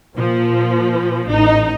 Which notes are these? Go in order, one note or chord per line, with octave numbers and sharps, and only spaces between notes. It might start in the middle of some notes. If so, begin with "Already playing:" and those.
A#2 F3
A1 D#4